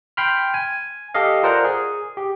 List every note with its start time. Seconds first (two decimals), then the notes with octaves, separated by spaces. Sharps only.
0.17 G5 B5 C6 F6
0.54 G#5
1.14 G4 A4 D#5 F5
1.43 F4 A#4 C5 D5 F#5 A#5
1.64 G#4
2.17 G4